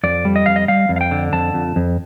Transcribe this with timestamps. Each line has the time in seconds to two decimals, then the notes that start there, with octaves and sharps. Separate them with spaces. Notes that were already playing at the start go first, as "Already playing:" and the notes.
0.03 F2 D5
0.25 G3
0.36 D#5
0.46 F2 F5
0.56 D#5
0.68 G3 F5
0.89 F2
0.96 F5
1.01 G5
1.11 D3
1.33 F2 A5
1.54 F2
1.76 F2